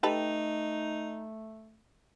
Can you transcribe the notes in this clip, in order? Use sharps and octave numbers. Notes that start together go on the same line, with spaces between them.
A3 D#4 G4 A4 B4